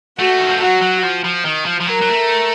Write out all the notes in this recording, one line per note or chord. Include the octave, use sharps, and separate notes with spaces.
A3 F#4
D#3
F3
F#3 F#4
F#3
F3
F3
D#3
F3
F3
F#3 A#4
F#3
A3